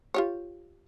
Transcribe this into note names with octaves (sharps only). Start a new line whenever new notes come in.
F4 G4 C#5